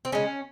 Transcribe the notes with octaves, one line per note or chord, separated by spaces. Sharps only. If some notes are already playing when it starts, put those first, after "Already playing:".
C4
C#3 G#3 C#4